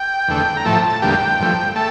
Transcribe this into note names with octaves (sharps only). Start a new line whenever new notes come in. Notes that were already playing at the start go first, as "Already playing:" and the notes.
Already playing: G5
E2 D3 A3
A#5
A2 F3 A3 A5
A5
E2 D3 G3 A#3 G5
G2 F3 A3
A3 A5